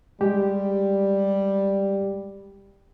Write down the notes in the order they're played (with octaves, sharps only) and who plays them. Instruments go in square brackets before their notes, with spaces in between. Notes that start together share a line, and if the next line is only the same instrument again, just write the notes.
[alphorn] G3 [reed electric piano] G#3 G4